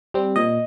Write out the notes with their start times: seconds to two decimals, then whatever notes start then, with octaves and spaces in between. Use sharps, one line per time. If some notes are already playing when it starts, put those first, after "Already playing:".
0.14 G3 C4
0.36 A#2 D#5